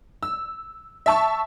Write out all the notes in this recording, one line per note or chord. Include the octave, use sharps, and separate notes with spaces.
E6
E5 A5 C#6